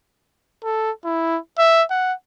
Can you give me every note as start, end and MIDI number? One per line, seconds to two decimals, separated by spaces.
0.64 0.91 69
1.05 1.38 64
1.58 1.83 76
1.90 2.13 78